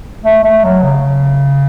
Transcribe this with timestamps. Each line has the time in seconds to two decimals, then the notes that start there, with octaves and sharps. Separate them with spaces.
0.24 A3
0.44 A3
0.64 F#3
0.83 C#3